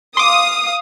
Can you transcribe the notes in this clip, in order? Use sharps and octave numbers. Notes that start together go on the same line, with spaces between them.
F5 C6 D6 D#6